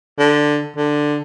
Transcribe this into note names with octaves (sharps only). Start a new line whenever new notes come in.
D3
D3